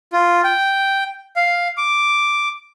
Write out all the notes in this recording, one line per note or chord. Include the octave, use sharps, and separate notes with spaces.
F4
G5
F5
D6